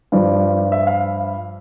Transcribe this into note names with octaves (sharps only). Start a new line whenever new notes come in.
G2 F3 D5
E5
F5